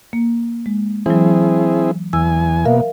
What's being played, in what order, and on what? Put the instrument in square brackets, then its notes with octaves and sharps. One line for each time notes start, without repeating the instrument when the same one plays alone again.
[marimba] A#3
G#3
[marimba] E3 F#3 [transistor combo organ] C4 E4 G#4
[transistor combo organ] E2 G#5 [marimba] E6
[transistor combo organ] B2 A#3 [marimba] A#4 E5 F5